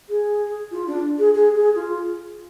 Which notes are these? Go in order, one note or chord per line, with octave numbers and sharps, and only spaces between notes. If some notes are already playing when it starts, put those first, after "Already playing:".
G#4
F4
D4
G#4
G#4
G#4
F4